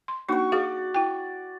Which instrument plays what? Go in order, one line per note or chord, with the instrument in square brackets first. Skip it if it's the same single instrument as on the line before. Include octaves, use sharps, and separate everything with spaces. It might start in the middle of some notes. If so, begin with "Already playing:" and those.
[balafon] C6
[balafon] A#3 D4 D#4 [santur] F#4 C#6
[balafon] F#4 G#4 F5 [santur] D5
[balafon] E4 G5